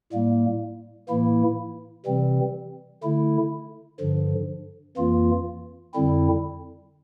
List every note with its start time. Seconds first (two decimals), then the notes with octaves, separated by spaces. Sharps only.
0.13 A2 G3 A#3
1.09 A2 E3 A#3 E4
2.06 C3 E3 G3 C4
3.03 D3 A3 E4
4.00 G2 D3 F3
4.97 F2 E3 A#3 F4
5.94 F2 D3 G3 C4 E4